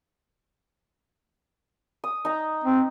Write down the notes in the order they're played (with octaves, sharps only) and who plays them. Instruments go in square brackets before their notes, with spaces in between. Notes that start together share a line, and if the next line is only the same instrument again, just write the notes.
[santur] D#6
D#4 A#5
[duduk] C4